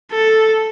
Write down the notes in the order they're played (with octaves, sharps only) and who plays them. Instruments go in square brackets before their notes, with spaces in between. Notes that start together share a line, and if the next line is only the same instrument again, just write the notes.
[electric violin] A4